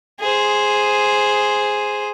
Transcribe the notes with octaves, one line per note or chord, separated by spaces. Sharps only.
G#4 C5